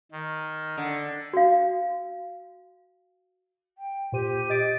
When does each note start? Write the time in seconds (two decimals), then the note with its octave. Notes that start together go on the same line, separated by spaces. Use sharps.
0.12 D#3
0.77 D3
1.33 F#4 F5
3.78 G5
4.12 A#2 G4 C5 D#7
4.50 D#5 A6 D7